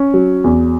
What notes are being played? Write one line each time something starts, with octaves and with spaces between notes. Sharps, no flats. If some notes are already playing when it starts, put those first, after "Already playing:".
Already playing: C#4
F#3
E2